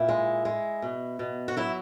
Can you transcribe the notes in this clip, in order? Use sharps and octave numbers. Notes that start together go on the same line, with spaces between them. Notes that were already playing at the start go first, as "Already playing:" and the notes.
Already playing: A#2 E4
G#3
G#3
B2
B2
F#4
F#3 E4